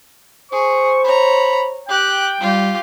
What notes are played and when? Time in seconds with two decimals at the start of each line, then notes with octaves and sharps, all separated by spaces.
0.52 G#4 C5 C#6
1.04 C#5 A#5 B5
1.88 G4 G5 F#6
2.40 G3 F4 G4